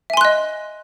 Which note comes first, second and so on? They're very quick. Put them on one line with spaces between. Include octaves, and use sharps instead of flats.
E5 G#5 C6 F#6 D#5